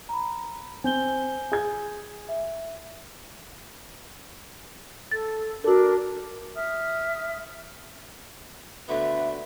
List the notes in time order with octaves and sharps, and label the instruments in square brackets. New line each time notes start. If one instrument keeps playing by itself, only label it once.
[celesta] A#5 B5
[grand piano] C4 [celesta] G#5 G6 G7
[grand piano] G#4 G#6
[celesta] E5
[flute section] A4 [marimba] A6
[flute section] D4 A#4 [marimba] F#4 A4
[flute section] E5 D#6 F6
[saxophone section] D2 D3 B3 [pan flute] E5